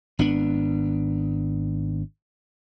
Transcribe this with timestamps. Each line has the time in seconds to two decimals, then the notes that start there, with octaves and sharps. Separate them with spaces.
0.19 G#1 B3 D4